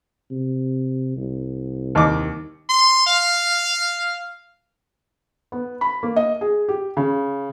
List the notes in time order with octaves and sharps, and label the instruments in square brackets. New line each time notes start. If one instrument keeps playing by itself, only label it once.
[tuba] C3
C2
[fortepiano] D#2 D#5 D6
[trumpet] C6
F5
[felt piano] B3
B5
A#3
D#5
G#4
G4
C#3